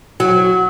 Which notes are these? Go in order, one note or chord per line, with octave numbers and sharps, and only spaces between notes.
F#3